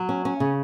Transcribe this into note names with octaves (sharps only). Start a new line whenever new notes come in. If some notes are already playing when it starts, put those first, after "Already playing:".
Already playing: F#3
C#4
C#4
C#3